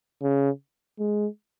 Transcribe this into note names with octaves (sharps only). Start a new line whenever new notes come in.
C#3
G#3